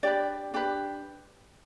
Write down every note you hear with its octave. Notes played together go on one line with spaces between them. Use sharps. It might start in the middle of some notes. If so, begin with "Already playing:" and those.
D4 G4 B4 D5
D4 G4 B4